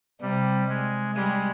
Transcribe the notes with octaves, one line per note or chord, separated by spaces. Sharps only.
C3 G3
G#3
G3 G#3